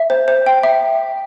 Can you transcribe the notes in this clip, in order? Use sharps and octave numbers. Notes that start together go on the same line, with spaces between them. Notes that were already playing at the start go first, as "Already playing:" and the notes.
Already playing: E5
C5
C5
G5
E5